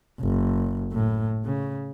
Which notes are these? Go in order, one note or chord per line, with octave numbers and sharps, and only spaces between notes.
F#1
A2
C#3